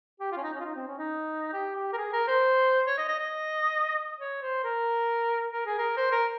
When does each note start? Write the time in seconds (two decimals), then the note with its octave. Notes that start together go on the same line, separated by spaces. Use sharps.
0.20 G4
0.32 F4
0.37 C#4
0.43 D#4
0.54 C#4
0.60 F4
0.65 D#4
0.76 C4
0.87 C#4
0.98 D#4
1.53 G4
1.75 G4
1.93 A#4
1.97 G#4
2.13 A#4
2.28 C5
2.87 C#5
2.97 D#5
3.08 D#5
3.20 D#5
4.20 C#5
4.42 C5
4.64 A#4
5.52 A#4
5.66 G#4
5.78 A#4
5.97 C5
6.12 A#4